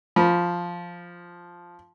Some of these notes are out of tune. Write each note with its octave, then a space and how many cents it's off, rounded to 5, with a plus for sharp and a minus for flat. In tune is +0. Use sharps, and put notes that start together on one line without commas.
F3 +0 B5 -25